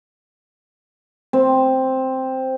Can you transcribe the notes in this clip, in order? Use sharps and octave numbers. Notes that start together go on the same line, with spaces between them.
C4